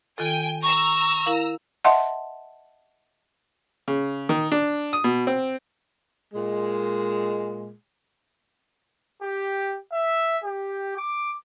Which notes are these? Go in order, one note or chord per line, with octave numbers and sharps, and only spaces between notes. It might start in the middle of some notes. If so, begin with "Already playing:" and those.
D#3 F4 A4 G5 G#5
A#5 C#6 E6
E4 A#4 F5
D#5 E5 F#5 A5 C6
C#3
D#3
D4
D#6
B2
C4
A#2 G#3
G4
E5
G4
D6